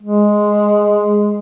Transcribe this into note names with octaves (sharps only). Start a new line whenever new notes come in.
G#3